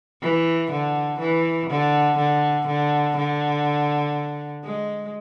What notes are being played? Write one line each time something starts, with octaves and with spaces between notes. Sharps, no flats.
E3
D3
E3
D3
D3
D3
D3
G#3